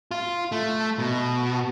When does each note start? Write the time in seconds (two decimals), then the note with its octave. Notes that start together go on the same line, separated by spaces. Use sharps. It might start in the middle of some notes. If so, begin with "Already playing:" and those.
0.11 F4
0.52 A3
0.99 B2